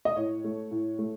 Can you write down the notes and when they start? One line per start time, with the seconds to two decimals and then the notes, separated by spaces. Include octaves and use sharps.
0.05 D#5
0.16 A2 C#5
0.44 A3
0.71 A2
0.99 A3